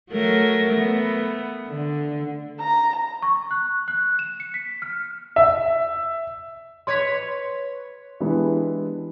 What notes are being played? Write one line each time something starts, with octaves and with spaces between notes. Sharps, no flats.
F#3 A3 A#4
A3 B3
D3
A#5
C#6
F#6
F#6
E7
C#7
B6
F6
E5
B4 C#5 C6 G#6 B6
E3 G#3 B3 D4 G4 B4